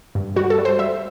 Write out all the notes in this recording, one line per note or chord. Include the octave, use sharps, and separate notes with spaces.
G2
G3 F#4
A4
G3
C5
G3 E5